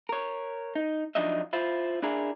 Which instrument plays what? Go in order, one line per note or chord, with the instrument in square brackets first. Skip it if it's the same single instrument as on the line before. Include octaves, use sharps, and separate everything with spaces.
[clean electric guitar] A#4 C#5
D#4
F3 F#3 D4 D#4 D#5 E5
E4 F4 C5
D4 E4 G#4 A#4